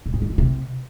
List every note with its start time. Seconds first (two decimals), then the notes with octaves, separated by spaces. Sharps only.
0.06 A2
0.14 G#2
0.22 D#3
0.30 F2
0.38 C3